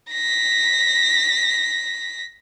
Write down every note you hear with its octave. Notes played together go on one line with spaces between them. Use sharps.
A#6 B6